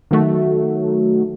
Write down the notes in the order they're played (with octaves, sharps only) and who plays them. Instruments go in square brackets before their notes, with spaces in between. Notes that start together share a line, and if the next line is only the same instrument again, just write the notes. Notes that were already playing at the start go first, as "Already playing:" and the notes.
[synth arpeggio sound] D#3 F#3 A3 F#4